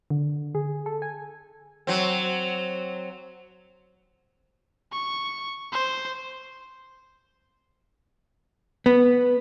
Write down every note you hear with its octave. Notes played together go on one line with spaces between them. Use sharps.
D3
G#4
A4
G#5
F#3 C4
C#6
C5
B3